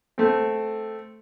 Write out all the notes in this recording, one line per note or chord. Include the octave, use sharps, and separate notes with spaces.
A3 C4